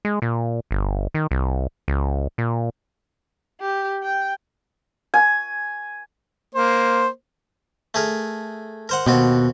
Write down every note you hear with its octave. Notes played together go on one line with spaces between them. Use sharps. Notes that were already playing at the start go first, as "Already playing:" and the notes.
G#3
A#2
G1
D#3
C2
C#2
A#2
G4
G5
G#5
A#3 C5
A3 G#4 A#4
A#4 C5 F#5
D#2 B2 C4 F#4